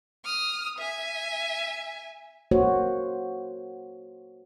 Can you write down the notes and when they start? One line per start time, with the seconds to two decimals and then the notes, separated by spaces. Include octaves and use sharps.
0.24 D#6 F6
0.79 E5 G#5
2.51 A#3 F#4 C5 C#5